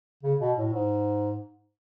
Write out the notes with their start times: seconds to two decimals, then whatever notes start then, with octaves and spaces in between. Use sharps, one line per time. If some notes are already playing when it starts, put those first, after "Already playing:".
0.23 C#3
0.40 B2
0.57 A2
0.73 G#2